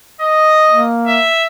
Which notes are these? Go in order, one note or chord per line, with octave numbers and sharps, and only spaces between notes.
D#5
A#3
E5